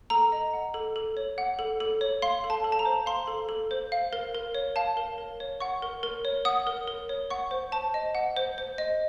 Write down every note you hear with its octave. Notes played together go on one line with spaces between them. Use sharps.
A4 A#5
D#5
F#5
A4
A4
C#5
F#5
A4
A4
C#5
F5 C6
A4
A5
A4
A5
A#5
C5
F5 C6
A4
A4
C5
F5
A#4
A#4
C#5
F5 A5
A#4
A#4
C#5
F#5 C#6
A#4
A#4
C#5
F#5 D#6
A#4
A#4
C#5
F#5 C#6
C5
C5 A5
D#5
F#5
C5
C5
D#5